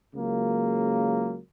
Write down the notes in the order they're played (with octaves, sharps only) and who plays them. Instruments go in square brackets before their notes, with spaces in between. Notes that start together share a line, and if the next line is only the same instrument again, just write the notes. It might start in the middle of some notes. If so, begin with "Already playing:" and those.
[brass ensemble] C#2 C#3 F#3 A#3